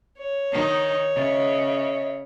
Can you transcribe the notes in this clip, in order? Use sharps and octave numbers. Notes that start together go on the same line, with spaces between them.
C#5
D#3 D#4
C#3 D#5 E5